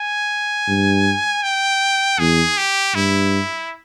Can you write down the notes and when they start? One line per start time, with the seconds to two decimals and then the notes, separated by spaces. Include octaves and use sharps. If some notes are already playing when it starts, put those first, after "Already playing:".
Already playing: G#5
0.68 G2
1.43 G5
2.19 E2 G#4
2.57 G4
2.95 G2 E4